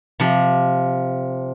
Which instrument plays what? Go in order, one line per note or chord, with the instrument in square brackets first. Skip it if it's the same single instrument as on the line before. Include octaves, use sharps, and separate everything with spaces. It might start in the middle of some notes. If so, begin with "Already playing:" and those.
[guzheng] C3 F3